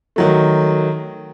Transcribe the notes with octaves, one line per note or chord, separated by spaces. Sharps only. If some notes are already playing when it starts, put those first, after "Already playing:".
D#3 F#3 A3